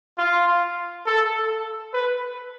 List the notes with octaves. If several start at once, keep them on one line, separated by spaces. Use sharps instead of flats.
F4
A4
B4